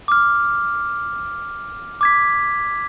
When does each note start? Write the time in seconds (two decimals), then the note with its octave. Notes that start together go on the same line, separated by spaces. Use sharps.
0.08 D6 F6
2.01 D6 G#6 B6